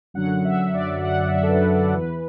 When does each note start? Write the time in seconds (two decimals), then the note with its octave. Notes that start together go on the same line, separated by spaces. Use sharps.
0.14 F#2 D3 F#3 F#5
0.45 E5
0.74 D5
1.04 F#5
1.27 E5
1.43 A4
1.49 B4
1.71 D5
1.94 E2 E3 B4